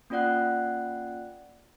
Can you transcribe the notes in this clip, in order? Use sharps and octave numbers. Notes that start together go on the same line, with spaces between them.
A#3 C#4 F4 D5 F#5 F#6